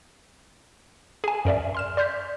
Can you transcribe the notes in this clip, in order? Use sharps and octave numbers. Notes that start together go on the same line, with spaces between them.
G#4 G#5
F#2 A#4 D5 E5
C6 F6 E7
D5 C6 F6 G6 B6